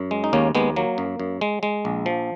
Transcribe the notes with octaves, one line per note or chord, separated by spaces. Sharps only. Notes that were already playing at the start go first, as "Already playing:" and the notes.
Already playing: F#2
G#3
D#4
D#2 A#3 C#4
D#2 G#3 B3
F#3 A#3
F#2
F#2
G#3
G#3
A#1
F3